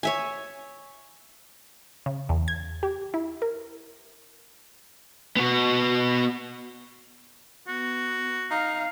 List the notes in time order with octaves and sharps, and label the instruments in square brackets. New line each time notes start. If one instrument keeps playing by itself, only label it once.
[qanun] C#5 E5 G#5
[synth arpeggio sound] C#3
E2
G#6
G4
E4
A#4
[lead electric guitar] B3 F#4
[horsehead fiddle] B3 [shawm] F#4
[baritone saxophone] D#4 [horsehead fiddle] F5